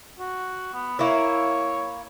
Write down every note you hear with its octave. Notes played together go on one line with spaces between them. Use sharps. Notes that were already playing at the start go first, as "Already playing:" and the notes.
F#4
B3
A#3 E4 C#5